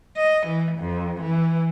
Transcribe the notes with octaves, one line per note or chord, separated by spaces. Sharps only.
D#5
E3
F2
E3